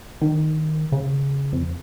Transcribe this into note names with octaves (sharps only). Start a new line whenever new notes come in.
D#3
C#3
F2